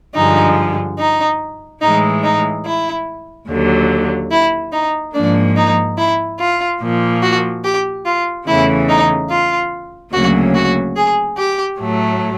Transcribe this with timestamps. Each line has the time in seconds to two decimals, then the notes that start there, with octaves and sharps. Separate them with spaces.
0.15 G2 D3 F3 G#3 D#4
0.98 D#4
1.81 A2 E3 G#3 D#4
2.24 D#4
2.65 E4
3.49 D#2 D3 F#3
4.31 E4
4.72 D#4
5.14 G#2 F3 A#3 D4
5.56 D#4
5.97 E4
6.38 F4
6.80 A#2 F3 A#3
7.22 F#4
7.64 G4
8.05 F4
8.47 E2 C#3 E3 A3 E4
8.89 D#4
9.30 F4
10.13 D2 C#3 F#3 A#3 F#4
10.54 F#4
10.96 G#4
11.37 G4
11.78 A2 F#3 A3